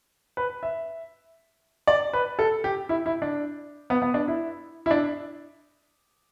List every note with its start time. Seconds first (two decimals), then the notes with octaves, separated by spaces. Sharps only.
0.37 B4
0.63 E5
1.87 D5
2.13 B4
2.39 A4
2.64 G4
2.89 E4
3.06 E4
3.22 D4
3.90 B3
4.02 B3
4.14 D4
4.28 E4
4.86 E4
4.91 D4